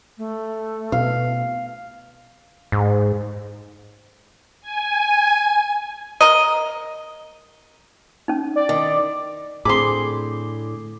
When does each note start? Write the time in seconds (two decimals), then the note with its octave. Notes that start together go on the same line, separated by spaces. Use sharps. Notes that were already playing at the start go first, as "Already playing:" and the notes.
0.18 A3
0.92 B2 F5
2.72 G#2
4.61 G#5
6.21 A#4 D#5
8.28 C#4 D#4
8.56 D5
8.69 D#3
9.65 A2 D3 C4 G#4 B5 C6 D6